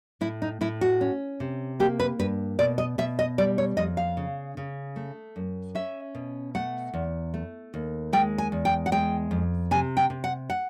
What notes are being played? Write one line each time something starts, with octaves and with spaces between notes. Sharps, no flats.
A2 E4
D#4
A2 E4
F#4
C#4
C3
A#3 G4
B4
G2 B4
B2 D5
D#5
B2 E5
D#5
G3 D5
C#5
F2 D#5
F5
C#3
C#3
A3
F#2
C#4 E5
B2
A3 F#5
E2
A3
D#2
G#3 G5
G#5
E2
G5
F#5
G#3 G5
F2
C3 G#5
G5
C3
F#5
F#5